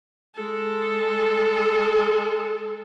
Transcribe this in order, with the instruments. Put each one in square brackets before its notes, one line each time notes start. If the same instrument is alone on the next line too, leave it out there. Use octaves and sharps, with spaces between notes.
[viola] G#3 A4